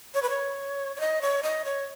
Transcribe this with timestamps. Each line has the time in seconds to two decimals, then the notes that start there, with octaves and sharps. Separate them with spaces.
0.14 C#5
0.22 B4
0.29 C#5
0.96 C#5
1.00 D#5
1.22 C#5
1.43 D#5
1.65 C#5